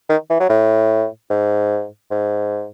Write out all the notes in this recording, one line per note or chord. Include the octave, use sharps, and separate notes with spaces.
D#3
E3
F#3
A2
G#2
G#2